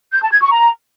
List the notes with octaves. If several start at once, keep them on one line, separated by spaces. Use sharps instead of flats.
G6
A5
G#6
C#6
A#5